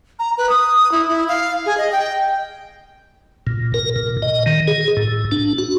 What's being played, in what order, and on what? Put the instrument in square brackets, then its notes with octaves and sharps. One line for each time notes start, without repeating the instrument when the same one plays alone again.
[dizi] A#5
B4
D#6
E4
E4
F5
G#4
D#5
G5
[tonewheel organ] A#2
A#4
A#2
D#5
D#3
G#4
A2
D4
F#4